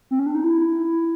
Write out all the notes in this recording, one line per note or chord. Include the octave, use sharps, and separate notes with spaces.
C4
C#4
D4
D#4
E4